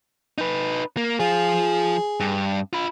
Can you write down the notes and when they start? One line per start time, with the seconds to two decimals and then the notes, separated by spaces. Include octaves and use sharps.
0.38 D#4 B4
0.97 A#3
1.20 F3 F4 G#4
2.20 G2
2.73 F4 B5